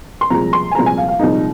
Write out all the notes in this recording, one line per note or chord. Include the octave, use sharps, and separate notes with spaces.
C6
C2 A#2 F3 G#3 A#5
C6
G#5
C2 A#2 F3 G#3 A#5
G#5
F5
F5
C2 A#2 F3 G#3 D#4